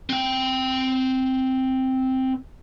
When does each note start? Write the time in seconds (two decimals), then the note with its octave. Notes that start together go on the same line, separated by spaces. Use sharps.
0.09 C4 G5